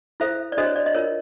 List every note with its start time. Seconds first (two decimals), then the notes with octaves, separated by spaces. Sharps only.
0.20 E4 A4 C5 E5
0.52 D5
0.57 D4 F#4 A4 C5 D#5
0.66 C#5
0.76 D5
0.86 D#5
0.95 F4 A#4 C#5